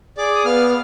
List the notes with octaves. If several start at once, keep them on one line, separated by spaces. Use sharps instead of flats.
G#4 D5 D6
D#6
B3 F5 F6